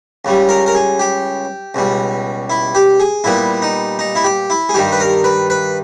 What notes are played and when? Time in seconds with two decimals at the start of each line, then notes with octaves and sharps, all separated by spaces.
0.25 C#2 C#3 G3
0.49 A#4
0.66 A#4
0.75 G#4
0.99 G4
1.75 C#2 B2 G3
2.50 E4
2.75 G4
3.00 G#4
3.24 A#2 G3 B3 E4
3.62 D#4
3.99 D#4
4.15 E4
4.24 G4
4.50 E4
4.69 G#4
4.74 G2 D#3 G3 G4
4.92 B4
5.00 A#4
5.24 B4
5.50 B4